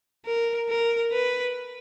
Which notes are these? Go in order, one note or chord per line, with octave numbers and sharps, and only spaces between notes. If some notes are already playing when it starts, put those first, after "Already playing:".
A#4
A#4
B4